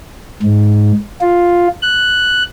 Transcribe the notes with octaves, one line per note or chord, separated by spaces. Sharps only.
G#2
F4
F#6